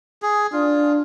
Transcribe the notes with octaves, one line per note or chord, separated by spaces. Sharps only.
G#4
D4 F4